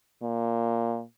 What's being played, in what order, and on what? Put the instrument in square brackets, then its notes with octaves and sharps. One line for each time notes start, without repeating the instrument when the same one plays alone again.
[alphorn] A#2